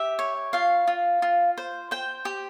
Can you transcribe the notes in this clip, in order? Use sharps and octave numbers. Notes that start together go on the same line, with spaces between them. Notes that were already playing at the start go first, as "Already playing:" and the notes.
Already playing: G4 E5
C#5
F4 F5
F4
F4
C5
C5 G5
G4